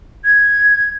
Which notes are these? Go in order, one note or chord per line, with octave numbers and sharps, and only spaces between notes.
G#6